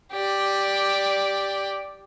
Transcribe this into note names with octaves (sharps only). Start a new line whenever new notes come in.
G4 D5